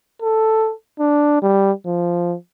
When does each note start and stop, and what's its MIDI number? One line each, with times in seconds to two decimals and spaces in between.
0.22 0.72 69
1.00 1.41 62
1.42 1.72 55
1.86 2.35 53